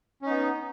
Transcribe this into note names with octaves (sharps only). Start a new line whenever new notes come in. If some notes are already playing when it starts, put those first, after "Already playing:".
B3 C#4 D#4